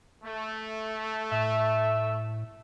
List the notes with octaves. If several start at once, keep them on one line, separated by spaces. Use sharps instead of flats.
A3
A2 E5